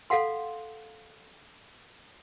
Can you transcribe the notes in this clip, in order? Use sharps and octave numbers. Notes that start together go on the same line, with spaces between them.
A4 F5 F#5 C6